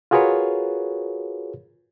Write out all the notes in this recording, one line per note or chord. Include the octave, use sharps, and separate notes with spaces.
F4 F#4 G#4 A#4 B4 C#5